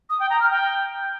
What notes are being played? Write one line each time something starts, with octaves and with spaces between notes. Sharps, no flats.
D#6
G5
A#5
F6
G5